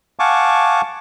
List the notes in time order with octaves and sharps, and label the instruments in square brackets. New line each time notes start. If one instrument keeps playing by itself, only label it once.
[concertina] F5 F#5 G#5 A5 C#6 D6